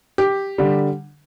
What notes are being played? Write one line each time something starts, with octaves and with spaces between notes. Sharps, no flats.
G4
D3 G3